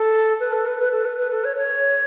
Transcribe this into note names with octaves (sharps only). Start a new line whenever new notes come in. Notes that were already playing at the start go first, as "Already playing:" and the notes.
Already playing: A4
B4
A4
B4
B4
A4
B4
B4
A4
C#5
C#5